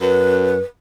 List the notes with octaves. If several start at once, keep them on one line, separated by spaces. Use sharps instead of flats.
F#2 B4